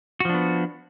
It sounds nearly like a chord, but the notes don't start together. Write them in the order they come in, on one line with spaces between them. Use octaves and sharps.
F#4 F3 D4 B3